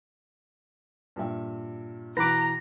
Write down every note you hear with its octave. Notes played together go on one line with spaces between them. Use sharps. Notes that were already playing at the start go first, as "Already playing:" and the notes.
G2 A#2 E5
B2 E3 B4 A#5 D6 A#6